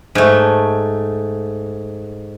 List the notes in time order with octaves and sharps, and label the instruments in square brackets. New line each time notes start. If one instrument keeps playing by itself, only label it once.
[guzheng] G#2 A3